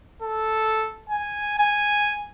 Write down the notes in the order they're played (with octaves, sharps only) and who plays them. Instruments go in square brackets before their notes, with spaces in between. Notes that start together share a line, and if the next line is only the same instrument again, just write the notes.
[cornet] A4
G#5
G#5